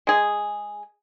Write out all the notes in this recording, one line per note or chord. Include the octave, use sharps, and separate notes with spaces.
G#3 G#4